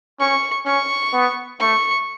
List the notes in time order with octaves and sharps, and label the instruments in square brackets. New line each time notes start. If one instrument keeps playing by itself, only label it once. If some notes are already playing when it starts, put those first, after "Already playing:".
[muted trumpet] C#4 [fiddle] C#6
[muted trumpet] C#4 [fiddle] C#6
[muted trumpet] B3
[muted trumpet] A3 [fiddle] C#6